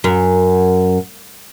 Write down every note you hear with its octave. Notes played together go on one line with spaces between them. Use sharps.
F#2